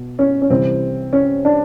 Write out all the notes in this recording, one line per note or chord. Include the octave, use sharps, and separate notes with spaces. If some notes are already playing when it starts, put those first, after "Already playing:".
Already playing: B2
C#4
C#4
C2 C3 E3 C4
C#4
D4